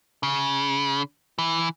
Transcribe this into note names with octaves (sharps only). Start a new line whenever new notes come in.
C#3
E3